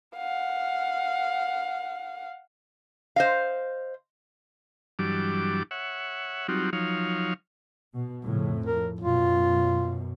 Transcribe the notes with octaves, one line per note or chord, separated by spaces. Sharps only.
F5 F#5
C5 D#5 F5
G2 E3 F#3 G3 D4 D6
C#5 E5 F#5
F#3 G3 C4 D#4 F4 F#4
F3 F#3 D#4 C#5 F5
B2
F2 A2 C#3
A#4
F#2 B2 F4